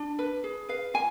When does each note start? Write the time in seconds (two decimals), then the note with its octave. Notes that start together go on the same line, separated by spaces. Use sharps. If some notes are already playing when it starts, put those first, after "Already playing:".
Already playing: D4
0.19 B4
0.44 G#4
0.69 B4 F5
0.94 F4 G#5